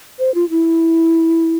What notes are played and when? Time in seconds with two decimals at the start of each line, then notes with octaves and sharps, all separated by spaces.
0.19 C5
0.35 F4
0.50 E4